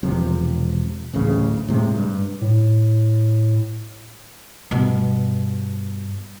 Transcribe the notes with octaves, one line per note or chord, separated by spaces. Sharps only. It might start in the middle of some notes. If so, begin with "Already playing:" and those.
E1 C3 F3
D1 A1 D2 C#3
A2 C3 G#3
G2
A2
G2 B2